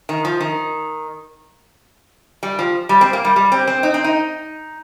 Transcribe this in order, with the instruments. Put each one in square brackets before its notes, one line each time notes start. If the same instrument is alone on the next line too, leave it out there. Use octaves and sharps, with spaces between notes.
[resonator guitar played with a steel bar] D#3
F3
D#3
G3
F3
G3
C4
A#3
G3
G3
C4
C4
D#4
C4
D#4